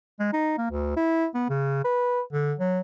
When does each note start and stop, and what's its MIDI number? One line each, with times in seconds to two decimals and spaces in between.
0.19 0.28 56
0.33 0.54 63
0.58 0.68 58
0.71 0.92 38
0.97 1.26 64
1.34 1.46 59
1.49 1.81 49
1.84 2.21 71
2.32 2.54 50
2.59 2.80 54